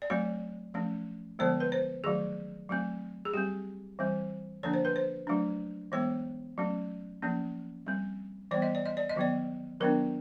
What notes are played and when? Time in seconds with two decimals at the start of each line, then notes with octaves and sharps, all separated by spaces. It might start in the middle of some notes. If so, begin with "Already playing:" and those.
0.02 D5
0.10 F#3 A3 C4 C#5
0.74 F3 A3 C#4
1.39 D3 F3 G#3 B3 C5
1.60 B4
1.72 C5
2.04 D#3 F#3 A3 G#4
2.69 F#3 A3 C4
3.25 G#4
3.34 G3 C4 G4
3.99 E3 G3 C4
4.63 D3 F3 A#3 D4 C#5
4.74 C5
4.85 B4
4.96 C5
5.27 F#3 A3 D4
5.92 E3 G#3 B3 C#5
6.58 F#3 A3 C#4
7.22 F3 A#3 C#4
7.86 G3 C4
8.51 E3 G3 B3 D5
8.62 D#5
8.75 D5
8.86 D#5
8.97 D5
9.10 D#5
9.16 D#3 F#3 B3 D5
9.80 D#3 F#3 B3 D4 A#4